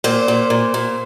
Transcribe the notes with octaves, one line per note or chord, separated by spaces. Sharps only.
A#2 C5
A#2
A#2
A#2